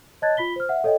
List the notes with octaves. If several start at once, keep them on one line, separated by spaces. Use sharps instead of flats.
C#5 D#5 A5 F#6 G#6 A6
F4 B5 B6 G7
C5 F6
E5 F#5
A4 C#5 D#5 G5